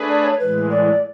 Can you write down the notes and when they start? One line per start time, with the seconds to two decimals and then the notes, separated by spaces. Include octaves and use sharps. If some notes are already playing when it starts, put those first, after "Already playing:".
Already playing: A3 D4 G#4 B4
0.09 D5
0.24 C#5
0.39 A2 E3 G#3 B4
0.71 D5